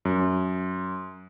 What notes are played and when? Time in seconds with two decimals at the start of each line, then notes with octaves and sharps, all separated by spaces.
0.05 F#2